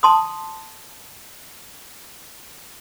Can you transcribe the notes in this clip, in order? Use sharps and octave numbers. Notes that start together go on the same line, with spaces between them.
A5 C6 D#6